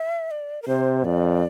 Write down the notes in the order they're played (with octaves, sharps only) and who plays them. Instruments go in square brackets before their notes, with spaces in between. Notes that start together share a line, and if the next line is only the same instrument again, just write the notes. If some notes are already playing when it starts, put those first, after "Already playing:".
Already playing: [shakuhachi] E5
D5
A#4
[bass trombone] C3 [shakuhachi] C5
[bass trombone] F2 [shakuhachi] D5